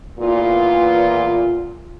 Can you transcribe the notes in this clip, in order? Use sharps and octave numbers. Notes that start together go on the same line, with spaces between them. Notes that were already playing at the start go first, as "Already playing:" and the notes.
E2 A#2 F4